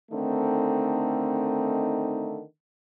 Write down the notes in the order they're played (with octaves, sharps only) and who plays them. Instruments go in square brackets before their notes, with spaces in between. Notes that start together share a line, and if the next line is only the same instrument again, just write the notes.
[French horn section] D3 D#3 A3 C4 D#4